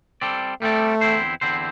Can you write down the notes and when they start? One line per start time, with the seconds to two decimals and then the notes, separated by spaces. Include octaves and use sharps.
0.21 G3 C4 A4 D5
0.62 G3 A3 C4 A4 D5
1.01 E2 D3 C4 E4 C5
1.41 E2 D3 C4 E4 C5